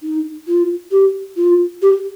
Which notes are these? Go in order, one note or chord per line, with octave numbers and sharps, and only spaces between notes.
D#4
F4
G4
F4
G4